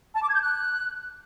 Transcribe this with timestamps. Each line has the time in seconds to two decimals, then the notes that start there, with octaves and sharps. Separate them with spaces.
0.15 A5
0.21 D6
0.28 G#6
0.35 G6
0.41 F#6